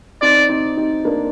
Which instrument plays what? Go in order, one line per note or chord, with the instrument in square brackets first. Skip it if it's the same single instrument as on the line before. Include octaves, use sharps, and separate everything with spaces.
[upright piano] C4 D#4 [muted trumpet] D5
[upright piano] C4 D#4
C4 D#4
A#3 D4